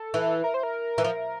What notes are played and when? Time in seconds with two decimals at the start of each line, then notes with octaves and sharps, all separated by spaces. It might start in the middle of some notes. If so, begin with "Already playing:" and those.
Already playing: A4
0.14 E3
0.44 A#4
0.54 C5
0.63 A#4
0.98 E3
1.04 F3